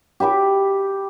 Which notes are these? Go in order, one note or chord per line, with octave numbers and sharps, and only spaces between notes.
G4 E5 B5 D6